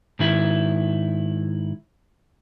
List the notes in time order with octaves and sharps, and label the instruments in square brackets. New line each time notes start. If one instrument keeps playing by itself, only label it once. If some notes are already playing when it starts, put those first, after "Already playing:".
[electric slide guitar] G#2 D#3 E4